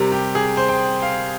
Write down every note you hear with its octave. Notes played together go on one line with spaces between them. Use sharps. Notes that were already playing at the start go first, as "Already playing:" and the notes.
Already playing: C3 G3 A#4
G4
G#4
C5
G5
F5